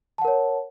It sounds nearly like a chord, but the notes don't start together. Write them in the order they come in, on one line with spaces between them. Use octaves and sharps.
A5 F#5 A#4 C#5